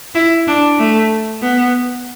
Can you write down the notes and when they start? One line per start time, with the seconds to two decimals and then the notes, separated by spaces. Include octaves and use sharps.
0.15 E4
0.47 D4
0.79 A3
1.42 B3